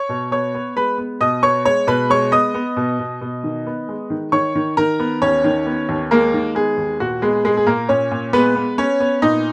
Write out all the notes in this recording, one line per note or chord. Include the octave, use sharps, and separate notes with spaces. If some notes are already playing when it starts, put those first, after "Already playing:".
Already playing: C#5 C#6
B2
B3 C#5 C#6
B3
G#3 B4 B5
B3
B2 D#5 D#6
B3 C#5 C#6
G#3 C#5 C#6
B2 B4 B5
G#3 C#5 C#6
B3 D#5 D#6
B3
B2
B2
B2
D#3
B3
G#3
D#3
D#3 C#5 C#6
D#3
D#3 A#4 A#5
B3
D#2 C#4 C#5
D#3
B3
D#2
G#3 A#3 A#4
D#3
G#3 B3 G#4
D#2
A#2 F#4
G#3 B3 G#4
A#2 G#3 G#4
G#4
A#2 A#3 A#4
A#2 C#4 C#5
A#2
G#3 B3 B4
B3
B3 C#4 C#5
B3
A#2 D#4 D#5